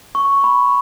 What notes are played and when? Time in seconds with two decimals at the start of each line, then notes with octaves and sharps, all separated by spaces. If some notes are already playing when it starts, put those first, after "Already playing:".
0.15 C#6
0.44 B5